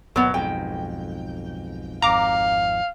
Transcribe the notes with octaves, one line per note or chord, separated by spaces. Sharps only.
G#1 D#2 B2 F#3 B3
B1 F2 G#2 G5
G#1 F2 F5 A#5 D6